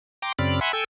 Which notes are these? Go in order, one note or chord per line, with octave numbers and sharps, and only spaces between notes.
G5 A#5 C6 D6
F#2 C#3 C4 D5 B5 F6
E5 F#5 G#5 B5 C6
A4 G5 G#5 E6